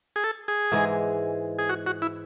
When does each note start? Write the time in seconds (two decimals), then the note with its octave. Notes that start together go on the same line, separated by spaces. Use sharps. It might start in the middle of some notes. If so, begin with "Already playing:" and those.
0.16 G#4
0.24 A4
0.48 G#4
0.72 G#2 E3 G#3
1.59 G#4
1.69 F#4
1.86 F#4
2.02 E4